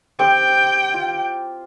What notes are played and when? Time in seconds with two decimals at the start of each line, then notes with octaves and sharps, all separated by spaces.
0.19 C4 G4 C5 G5
0.94 F4